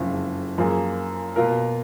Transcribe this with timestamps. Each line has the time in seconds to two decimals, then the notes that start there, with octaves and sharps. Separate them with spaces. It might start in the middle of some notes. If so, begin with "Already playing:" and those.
Already playing: F#1 F2 C#3
0.58 F#2 F3 A#3 F4 G#4
1.36 B2 A#3 F4 A#4